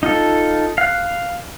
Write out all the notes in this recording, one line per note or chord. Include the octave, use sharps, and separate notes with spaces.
D#4 F4 A4
F5 F#6